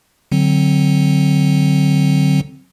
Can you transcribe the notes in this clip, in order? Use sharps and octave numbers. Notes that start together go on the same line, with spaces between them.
D3 F#3 C4